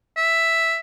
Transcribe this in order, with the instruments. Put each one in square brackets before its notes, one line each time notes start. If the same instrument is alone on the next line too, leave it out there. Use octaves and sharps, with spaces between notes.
[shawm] E5